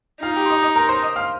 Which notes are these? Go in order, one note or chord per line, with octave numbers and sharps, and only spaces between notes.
D#4 F4 F5
G4 G5
C6
D#5 D#6
D#5 D#6
A#4 A#5
C5 C6
D#5 D#6
F5 F6